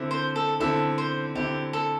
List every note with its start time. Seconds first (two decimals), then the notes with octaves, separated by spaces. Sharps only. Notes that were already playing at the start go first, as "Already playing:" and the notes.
Already playing: D3 C4 E4
0.11 C5
0.36 A4
0.60 D3 C4 E4 A4
0.98 C5
1.35 D3 C4 E4 G4
1.73 A4